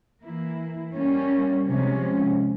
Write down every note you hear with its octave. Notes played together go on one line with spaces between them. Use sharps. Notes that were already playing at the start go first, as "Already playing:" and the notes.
E3 A#3 E4
G3 A#3 C#4
C3 F3 G#3 C#4